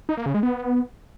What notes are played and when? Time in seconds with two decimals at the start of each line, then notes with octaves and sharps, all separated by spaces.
0.09 D#4
0.17 A#3
0.26 C#3
0.34 G#3
0.43 B3